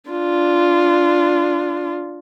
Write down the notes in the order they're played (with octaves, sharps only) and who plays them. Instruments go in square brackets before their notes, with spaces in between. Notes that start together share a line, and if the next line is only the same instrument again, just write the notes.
[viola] D4 F4